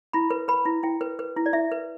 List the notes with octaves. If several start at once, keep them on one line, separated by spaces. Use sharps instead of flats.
E4 B5
B4
B4 B5
E4
E4 G5
B4
B4
E4
D5
E4 E5
B4